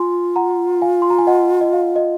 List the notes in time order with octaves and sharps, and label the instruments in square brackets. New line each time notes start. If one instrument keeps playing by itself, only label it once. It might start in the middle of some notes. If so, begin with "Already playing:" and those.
Already playing: [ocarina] F4 [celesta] G#5 C6
[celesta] F#5 A#5
F5 G#5
C6
A#5
G#5
D#5 F#5
D#5
F5
D#5